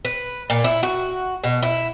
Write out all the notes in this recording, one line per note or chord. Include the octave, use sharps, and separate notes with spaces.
B4
A#2
E4
F#4
B2
E4